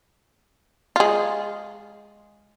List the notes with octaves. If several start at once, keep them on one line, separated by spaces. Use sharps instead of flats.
G#3 F4